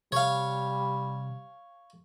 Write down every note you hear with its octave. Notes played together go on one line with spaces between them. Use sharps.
C3 G3 C#5 F5